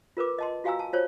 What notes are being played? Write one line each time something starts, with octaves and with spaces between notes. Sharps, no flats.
F4 A#4 B4 D6
D#5 A5 C6
F4 F#4 F5 G#5 A#5 E6
A5
F4 C5 C#5